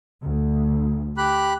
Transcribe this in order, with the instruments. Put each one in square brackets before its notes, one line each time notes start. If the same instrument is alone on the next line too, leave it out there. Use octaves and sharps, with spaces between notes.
[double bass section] D2
[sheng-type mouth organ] G4 B5 F#6